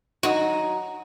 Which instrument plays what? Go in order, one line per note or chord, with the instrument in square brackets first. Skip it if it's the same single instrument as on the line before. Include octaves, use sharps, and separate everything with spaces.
[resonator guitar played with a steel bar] F#3 D#4 [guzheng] F#4